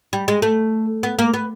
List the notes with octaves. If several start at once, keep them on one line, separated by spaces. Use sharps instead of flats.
G3
G#3
A3
B3
A#3
B3